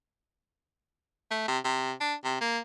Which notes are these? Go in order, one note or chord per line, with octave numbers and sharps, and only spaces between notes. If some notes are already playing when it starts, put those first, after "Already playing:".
A3
C3
C3
D4
C3
A#3